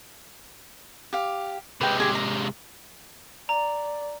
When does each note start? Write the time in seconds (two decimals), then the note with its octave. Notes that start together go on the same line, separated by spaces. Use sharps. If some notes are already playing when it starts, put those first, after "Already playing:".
1.13 G4 F5
1.81 C3 G#3 B4 G5
2.00 G4 G#4
2.15 A#5
3.49 D5 A#5